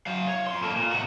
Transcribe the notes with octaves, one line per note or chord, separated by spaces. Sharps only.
F#3 F5
C#5
F2 C6
A#3 A4
A#2
C3 F#4